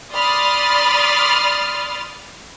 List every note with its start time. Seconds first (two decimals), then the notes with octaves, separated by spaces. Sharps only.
0.13 D5 B5 C6 D#6 F6 A6